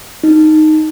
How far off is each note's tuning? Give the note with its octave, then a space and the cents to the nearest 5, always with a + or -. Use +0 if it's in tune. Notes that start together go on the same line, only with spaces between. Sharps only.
D#4 +0